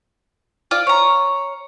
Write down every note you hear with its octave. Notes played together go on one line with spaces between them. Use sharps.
F4 D5
C#5 A#5